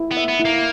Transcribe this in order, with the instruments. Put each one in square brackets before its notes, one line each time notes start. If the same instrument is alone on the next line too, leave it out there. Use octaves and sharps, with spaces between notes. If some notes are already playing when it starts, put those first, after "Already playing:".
Already playing: [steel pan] E4
[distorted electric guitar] B3
[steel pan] E5
[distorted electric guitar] B3
[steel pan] E4
[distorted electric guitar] A#3